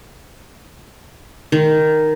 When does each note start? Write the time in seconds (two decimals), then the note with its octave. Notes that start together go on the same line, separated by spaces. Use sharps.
1.52 D#3